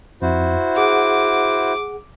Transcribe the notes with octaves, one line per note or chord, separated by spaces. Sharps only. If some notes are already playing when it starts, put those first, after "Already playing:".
F2 E4 F#4 C5
G#4 F#5 D6